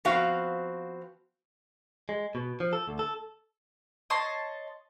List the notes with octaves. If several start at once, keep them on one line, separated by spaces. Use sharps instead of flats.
F3 B3 C4 F#4 F5
G#3
B2
F3
A4
D2
A4
C#5 D#5 A5 C6